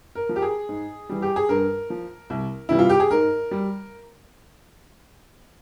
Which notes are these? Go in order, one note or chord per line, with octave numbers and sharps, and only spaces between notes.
A#4
F3
G4
G#4
G#2
E3 G3
G4
G#4
G2 A#4
F3
C2
C3 E3 G3 E4
F4
G4
G#4
G#2 A#4
G3